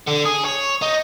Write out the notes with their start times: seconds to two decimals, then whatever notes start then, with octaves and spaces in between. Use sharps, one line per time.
0.07 D3
0.25 G#4
0.45 C#5
0.82 D#4